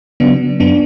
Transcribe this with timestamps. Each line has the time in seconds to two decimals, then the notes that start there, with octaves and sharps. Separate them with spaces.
0.20 C#3 F#3 B3 D4
0.60 F#2 B3 D4